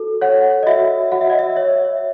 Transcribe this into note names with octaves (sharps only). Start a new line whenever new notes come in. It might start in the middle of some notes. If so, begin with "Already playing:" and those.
Already playing: F#4 A4
C#5 F#5
D#5
F#4 E5
F#4 F#5
E5
D#5
E5
C#5 E5